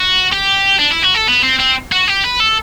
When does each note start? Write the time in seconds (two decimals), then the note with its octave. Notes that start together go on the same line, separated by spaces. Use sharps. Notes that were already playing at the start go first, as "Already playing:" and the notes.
Already playing: F#4
0.32 G4
0.79 D4
0.92 E4
1.04 F#4
1.16 A4
1.28 B3
1.44 C4
1.59 C4
1.92 F#4
2.08 G4
2.24 B4
2.40 A4